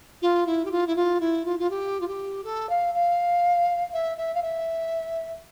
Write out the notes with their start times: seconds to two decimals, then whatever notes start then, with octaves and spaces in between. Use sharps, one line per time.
0.22 F4
0.46 E4
0.65 G4
0.71 F4
0.87 E4
0.96 F4
1.20 E4
1.45 F4
1.59 F4
1.70 G4
2.01 F4
2.08 G4
2.44 A4
2.69 F5
2.94 F5
3.93 E5
4.18 E5
4.34 F5
4.42 E5